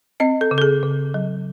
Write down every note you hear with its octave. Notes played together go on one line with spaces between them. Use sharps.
C4 D#5
A4
C#3
A4
G#4
C#3
F#3